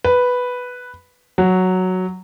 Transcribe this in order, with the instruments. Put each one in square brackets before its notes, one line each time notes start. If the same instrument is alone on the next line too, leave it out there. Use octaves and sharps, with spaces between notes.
[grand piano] B4
F#3